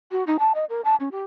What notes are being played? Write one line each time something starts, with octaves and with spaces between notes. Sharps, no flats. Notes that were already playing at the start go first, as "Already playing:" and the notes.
F#4
D#4
A5
D#5
A#4
A5
C#4
G4